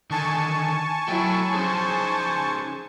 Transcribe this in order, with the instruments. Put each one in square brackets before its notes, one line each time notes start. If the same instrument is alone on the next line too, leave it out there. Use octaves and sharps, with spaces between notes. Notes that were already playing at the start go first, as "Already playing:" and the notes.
[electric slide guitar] D3 D#3 [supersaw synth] G#5 A5 C#6
[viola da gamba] F#3 E4 [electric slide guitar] A3 G5
[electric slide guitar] C#4 D#4 G#4 [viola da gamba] C5